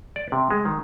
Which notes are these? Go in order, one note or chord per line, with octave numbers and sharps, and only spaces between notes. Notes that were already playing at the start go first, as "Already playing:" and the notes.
D5
C3
G#3
D#3